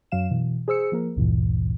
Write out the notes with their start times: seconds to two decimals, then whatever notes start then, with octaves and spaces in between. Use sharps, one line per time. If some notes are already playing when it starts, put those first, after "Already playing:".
0.12 F#2 F#3 F5 E7
0.31 B2 E3
0.68 G#4 C5 E6 C#7
0.92 F3 A#3 A#4
1.16 A1 D2 G2 A#2 E3